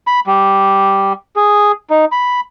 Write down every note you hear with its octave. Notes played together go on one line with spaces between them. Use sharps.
B5
G3
G#4
D#4
B5